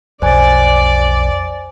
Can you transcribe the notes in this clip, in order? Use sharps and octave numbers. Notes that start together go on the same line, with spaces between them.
B1 F2 C5 D5 G#5